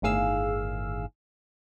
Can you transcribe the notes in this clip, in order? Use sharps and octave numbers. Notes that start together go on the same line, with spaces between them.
G1 A2 D#3 G#4 F5 E6